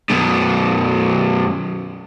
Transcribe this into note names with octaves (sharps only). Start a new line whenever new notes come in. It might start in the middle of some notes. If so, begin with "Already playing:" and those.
F#2 B2